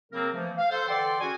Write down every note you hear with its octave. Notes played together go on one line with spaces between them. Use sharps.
C#3 F#3 A#3 C4 A#4
E3 F3 A3 A#3
F5
A4 C5
D3 E3 A4 D5 G5 C6
C#4 F#4 G#4 G#5